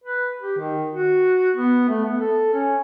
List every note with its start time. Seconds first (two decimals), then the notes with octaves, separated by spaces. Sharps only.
0.04 B4
0.41 G4
0.58 D#3
0.93 F#4
1.55 B3
1.89 A3
2.05 B3
2.20 A4
2.54 C#4